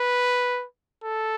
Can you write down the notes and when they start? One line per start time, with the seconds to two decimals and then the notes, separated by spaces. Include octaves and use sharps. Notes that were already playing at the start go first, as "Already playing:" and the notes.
Already playing: B4
1.04 A4